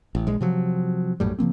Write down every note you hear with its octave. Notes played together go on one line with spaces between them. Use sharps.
A1
A#1 G#3
C3 F3 F#3
A#1 F#2 A2 G3
C#3 F3 A#3 C4